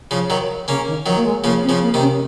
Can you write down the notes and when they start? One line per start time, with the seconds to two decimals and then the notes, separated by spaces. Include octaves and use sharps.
0.11 C#3 F3
0.30 D#3 F#3
0.68 C#3 A#3 C#4
0.87 D#3
1.06 D#3 F3 F#3
1.16 A#3
1.25 G#3
1.44 C#3 F3 A#3
1.63 C4
1.69 C#3 F3
1.82 A#3
1.94 C3 D#3
2.01 C#4